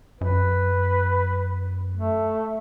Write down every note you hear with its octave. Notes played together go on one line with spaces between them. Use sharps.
F#2 B4
A3